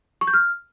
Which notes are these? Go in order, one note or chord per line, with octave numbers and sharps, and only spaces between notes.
C#6
G6
F6